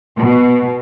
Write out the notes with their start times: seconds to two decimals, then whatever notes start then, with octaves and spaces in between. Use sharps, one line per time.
0.17 B2